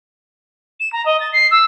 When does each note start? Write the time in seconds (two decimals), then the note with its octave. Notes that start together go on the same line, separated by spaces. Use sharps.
0.80 E7
0.93 A#5
1.06 D#5
1.20 A6
1.33 C7
1.51 E6